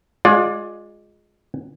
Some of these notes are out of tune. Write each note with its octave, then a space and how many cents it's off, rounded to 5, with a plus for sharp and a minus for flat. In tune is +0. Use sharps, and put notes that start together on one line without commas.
G#3 +0 F4 +30 D5 +0